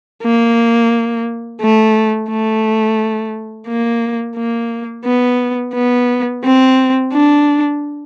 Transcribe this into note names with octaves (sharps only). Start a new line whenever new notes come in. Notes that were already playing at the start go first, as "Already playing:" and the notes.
A#3
A3
A3
A#3
A#3
B3
B3
C4
D4